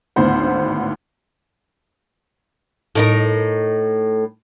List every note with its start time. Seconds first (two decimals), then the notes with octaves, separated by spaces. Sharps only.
0.16 G#1 D2 A2 B3 C5 F#5
2.95 A2 D#4 A#4